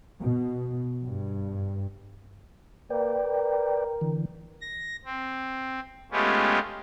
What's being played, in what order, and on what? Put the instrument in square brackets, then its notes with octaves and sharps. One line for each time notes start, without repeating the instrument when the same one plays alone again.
[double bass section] B2
G2
[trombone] A#3 [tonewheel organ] B4 D5 G5
[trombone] A#4
[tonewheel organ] D3 E3
[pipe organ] A#6
C4
G#3 A3 B3 C#4 F4 G4